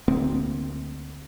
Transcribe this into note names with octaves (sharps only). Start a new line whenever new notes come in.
D2 A#3 C4